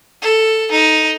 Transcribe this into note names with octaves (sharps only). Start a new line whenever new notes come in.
A4
D#4